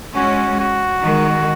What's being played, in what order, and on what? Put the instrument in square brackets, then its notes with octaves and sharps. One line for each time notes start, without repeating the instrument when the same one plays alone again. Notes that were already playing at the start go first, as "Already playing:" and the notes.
[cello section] G#3 C#4 [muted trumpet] F#4
[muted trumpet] F#4
[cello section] D#3 G#3